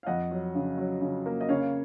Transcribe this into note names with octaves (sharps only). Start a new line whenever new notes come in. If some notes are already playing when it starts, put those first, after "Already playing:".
F5
F2 D#5 F#5
F#3
C#3
F#3
C#3
A#3
D#5
C#3 C#5 F5